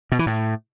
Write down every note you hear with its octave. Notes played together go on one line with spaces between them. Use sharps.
B2
E3
A2